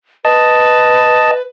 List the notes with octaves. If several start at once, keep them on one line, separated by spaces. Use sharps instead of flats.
B4 D#5 A5